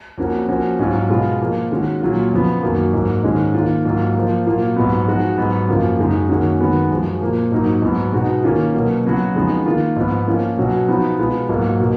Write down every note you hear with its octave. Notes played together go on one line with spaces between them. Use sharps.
F2 F3 A#3 C#4 F#4
F3 A#3 C#4 F#4
G#2 F#3 C#4 F4
B2 G#3 B3 F4
F3 A#3 F4
D#3 G#3 C#4 F#4
A#2 F#3 C#4 F4
F2 C#3 F3 B3
F#2 D#3 F#3 A#3
G#2 F#3 A#3
G#2 D#3 G#3 C#4
D#3 A#3 F4
G#2 F#3 A#3 F4
F3 A#3 F4
A#2 F#3 A#3 F4
G#2 F#3 B3
F3 G#3 D#4 F#4
G#2 F#3 B3
F#2 C#3 F3 A#3 F4
F#2 C#3 G#3 D#4
F#2 D#3 A#3 C#4 F#4
F#2 D#3 G#3 B3 F#4
F#2 F3 G#3
A#2 F3 A#3
G#2 F#3 A#3 D#4
G#2 F#3 B3
B2 G#3 D#4 F#4
D#3 A#3 C#4 F4
B2 F#3 A#3
C#3 F#3 B3 F#4
F2 C#3 G#3 B3 D#4
D#3 A#3 F4
G#2 F3 B3
F3 A#3 C#4 F4
B2 F#3 C#4 F#4
F3 B3 D#4 F#4
B2 G#3 B3 F4
G#2 F#3 A#3 F4
B2 A#3